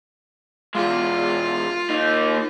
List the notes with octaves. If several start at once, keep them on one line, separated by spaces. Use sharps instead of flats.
E2 G#3 F4
A#3 D#4